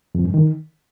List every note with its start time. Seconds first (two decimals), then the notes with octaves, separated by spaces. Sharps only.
0.15 F2
0.24 G2
0.34 D#3